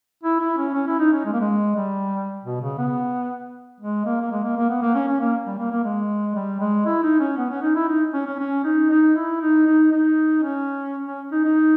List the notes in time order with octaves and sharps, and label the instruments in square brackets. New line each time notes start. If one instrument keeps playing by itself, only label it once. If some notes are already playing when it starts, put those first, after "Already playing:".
[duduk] E4
E4
C#4
C#4
E4
D#4
C#4
G#3
A#3
G#3
G3
B2
C#3
B3
G#3
A#3
A#3
G#3
A#3
A#3
B3
A#3
C#4
C#4
A#3
G3
A#3
A#3
G#3
G3
G#3
E4
D#4
C#4
B3
C#4
D#4
E4
D#4
C#4
C#4
C#4
D#4
D#4
E4
D#4
D#4
D#4
C#4
C#4
D#4
D#4